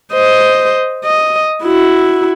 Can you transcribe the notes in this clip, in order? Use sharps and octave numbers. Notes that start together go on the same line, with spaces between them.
C5 D#5
D#5
E4 F#4